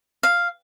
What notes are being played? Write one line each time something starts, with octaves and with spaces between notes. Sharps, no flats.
F5